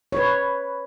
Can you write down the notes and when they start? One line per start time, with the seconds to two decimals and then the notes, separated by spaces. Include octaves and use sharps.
0.12 B4 C#5